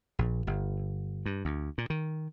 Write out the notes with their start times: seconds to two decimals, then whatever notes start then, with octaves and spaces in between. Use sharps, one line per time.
0.19 A#1
0.47 G1
1.26 G2
1.45 D2
1.78 A#2
1.90 D#3